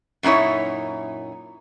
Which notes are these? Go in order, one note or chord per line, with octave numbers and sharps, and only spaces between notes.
F#2 A#2 D#4 E4 C#5